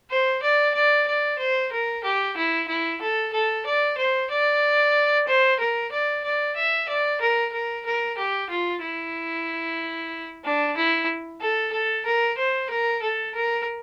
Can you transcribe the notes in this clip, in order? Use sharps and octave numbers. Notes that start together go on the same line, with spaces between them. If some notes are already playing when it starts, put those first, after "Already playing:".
C5
D5
D5
D5
C5
A#4
G4
E4
E4
A4
A4
D5
C5
D5
C5
A#4
D5
D5
E5
D5
A#4
A#4
A#4
G4
F4
E4
D4
E4
A4
A4
A#4
C5
A#4
A4
A#4